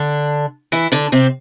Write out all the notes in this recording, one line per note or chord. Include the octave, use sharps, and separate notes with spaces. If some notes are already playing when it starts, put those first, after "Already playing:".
Already playing: D3 D4
E3 E4
D3 D4
C3 C4